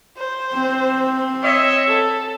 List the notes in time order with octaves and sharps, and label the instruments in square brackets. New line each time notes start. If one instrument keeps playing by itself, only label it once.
[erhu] C5
[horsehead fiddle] C4
[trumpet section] C#5 E5 [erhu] D#5
[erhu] A4